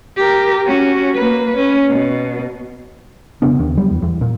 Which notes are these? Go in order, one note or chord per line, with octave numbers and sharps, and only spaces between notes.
G4 A#4
C#4 F#4
A#3 B4
C#4
B2
E1 C#3 B3 D4
D#2
F#3 G3
E2
E2
A#2